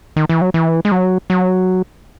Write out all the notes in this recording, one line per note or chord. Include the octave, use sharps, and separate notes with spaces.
D#3
E3
F#3
E3
G#3
F#3
F#3